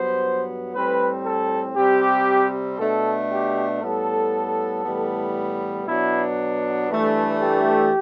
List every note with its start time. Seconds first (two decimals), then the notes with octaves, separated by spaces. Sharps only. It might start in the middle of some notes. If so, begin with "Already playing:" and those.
Already playing: G2 F#3 B3 C5
0.74 A2 G3 C4 B4
1.25 A4
1.76 C3 G3 C4 G4
2.79 B2 A3 D4 A4
3.30 G4
3.81 A2 G3 B3 A4
4.84 A2 E3 G3 B3
5.86 B2 F#3 B3 D4 E4
6.89 G2 E3 A3 D4
7.40 G4